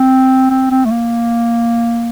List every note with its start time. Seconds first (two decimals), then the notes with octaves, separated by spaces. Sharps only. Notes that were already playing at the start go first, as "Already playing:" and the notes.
Already playing: C4
0.51 C4
0.71 C4
0.86 A3
0.91 A#3